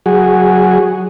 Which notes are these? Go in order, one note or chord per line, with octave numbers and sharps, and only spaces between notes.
F#3 F#4 G#4